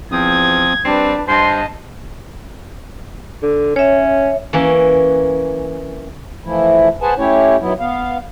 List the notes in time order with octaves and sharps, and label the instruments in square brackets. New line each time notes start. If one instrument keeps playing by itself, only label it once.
[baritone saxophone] E2 [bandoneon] F3 C4 D#6 [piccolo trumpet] G#6
[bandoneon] G3 [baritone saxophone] C4 [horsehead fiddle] D4 B4
[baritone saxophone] G2 [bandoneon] C5 [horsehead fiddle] D#5 A5 [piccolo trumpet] C6
[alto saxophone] D3
[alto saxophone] C#4 [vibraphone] C#5 E5
[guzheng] E3 A#3 C#4
[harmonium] E3 F3 A3 E4
G#4 B4 C5 F#5 G#5 A5
A3 C#4 E4 G4 C#5
D#3 F#3 B3 E4
B3 F5